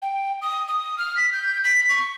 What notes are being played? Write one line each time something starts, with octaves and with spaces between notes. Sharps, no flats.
G5
D#6
D#6
F6
B6
G6
B6
C#6